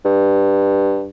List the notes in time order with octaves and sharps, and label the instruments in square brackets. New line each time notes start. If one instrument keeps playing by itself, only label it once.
[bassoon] G2